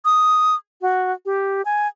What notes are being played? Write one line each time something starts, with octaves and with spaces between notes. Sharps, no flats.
D#6
F#4
G4
G#5